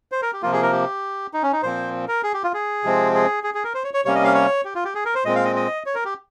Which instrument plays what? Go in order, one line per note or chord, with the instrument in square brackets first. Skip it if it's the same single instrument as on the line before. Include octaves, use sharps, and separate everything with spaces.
[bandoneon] C5
A#4
G4
C3 F3 A#3 F4
G#4
A#4
G4
D#4
C#4
D#4
A#2 F3 C4 C5
A#4
G#4
G4
F4
G#4
C3 F3 G#3 C4
G#4
G#4
G#4
A#4
C5
C#5
C#5
C3 G3 A#3 C#4 C#5
D#5
F5
C#5
G4
F4
G4
G#4
A#4
C5
A#2 G#3 C4 D#5
F5
D#5
D#5
C#5
A#4
G4